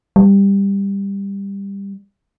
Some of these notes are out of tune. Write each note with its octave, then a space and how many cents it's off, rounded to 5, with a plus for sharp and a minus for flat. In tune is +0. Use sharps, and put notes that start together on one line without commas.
G3 +15